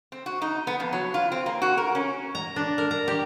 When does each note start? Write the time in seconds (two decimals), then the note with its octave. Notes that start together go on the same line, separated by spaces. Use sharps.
0.12 C4
0.26 F#4
0.42 D#4
0.67 B3
0.80 F2
0.93 F#3
1.14 F4
1.32 C4
1.46 A#3
1.62 F#4
1.77 A#4
1.95 C#4
2.35 A#5
2.56 D4
2.78 A#4
2.91 A#5
3.08 G4